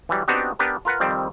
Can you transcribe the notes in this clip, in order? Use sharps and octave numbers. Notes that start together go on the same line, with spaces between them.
E3 F#3 G3
B3 C4 D4 D#4 F#4 G4
B3 D4 G4 A#4 B4
F4 A#4 B4 F#5
F2 D#3 G3 C4